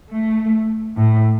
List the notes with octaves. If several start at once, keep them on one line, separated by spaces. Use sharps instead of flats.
A3
A2